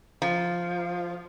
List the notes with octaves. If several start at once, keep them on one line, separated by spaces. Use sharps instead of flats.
F3